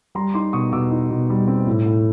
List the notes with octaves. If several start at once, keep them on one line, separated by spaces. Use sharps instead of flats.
G3 A#5 C6
D#4 C6 D6
B2 C#6 D#6
B2 D6 E6
D#4
B2
G3
C4
A2
A2